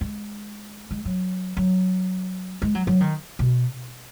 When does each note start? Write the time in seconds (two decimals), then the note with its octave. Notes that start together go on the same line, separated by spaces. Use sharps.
0.01 G#3
0.91 G#3
1.05 F#3
1.57 F#3
2.62 G#3
2.75 F#3
2.87 F#3
3.00 D#3
3.39 B2